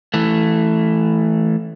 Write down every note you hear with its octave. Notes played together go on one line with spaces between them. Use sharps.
E3 A3